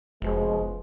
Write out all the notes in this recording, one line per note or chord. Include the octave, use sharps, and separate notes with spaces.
F1 B2 F3 G#3